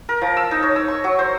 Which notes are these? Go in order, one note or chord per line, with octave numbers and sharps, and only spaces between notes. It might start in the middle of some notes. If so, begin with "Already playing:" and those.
A#4
F3
E6
D#4
C#5
E6
C#6
F#3
C5